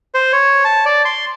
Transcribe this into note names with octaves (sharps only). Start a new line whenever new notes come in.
C5
C#5
A5
D5
C6